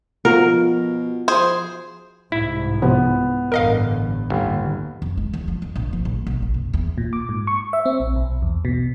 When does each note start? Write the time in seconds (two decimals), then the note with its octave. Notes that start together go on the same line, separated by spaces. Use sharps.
0.25 B2 F3 F#4 A#4
1.28 G#4 C5
2.32 C2 G#2 E4
2.82 C3 F3 B3
3.52 A1 G2 D3 A#4 D#5 F5
4.30 G1 D#2
5.02 F2
5.17 G#3
5.33 E2
5.48 F3
5.62 F2
5.76 A#1
5.93 F3
6.05 A#1
6.27 B1
6.42 A#1
6.54 F#1
6.74 E2
6.98 A#2
7.13 D6
7.29 G#2
7.47 C#6
7.73 E5
7.86 C4
8.00 A#1
8.16 B1
8.42 E2
8.65 B2